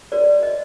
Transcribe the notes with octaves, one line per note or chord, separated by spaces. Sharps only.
F#4 A#4 C#5 D5
D#5